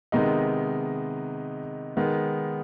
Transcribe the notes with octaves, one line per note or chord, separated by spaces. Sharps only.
C3 D#3 G#3 B3 D#4
D#3 G#3 B3